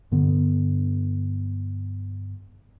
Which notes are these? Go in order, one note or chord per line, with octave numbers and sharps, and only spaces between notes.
G2 D3 B3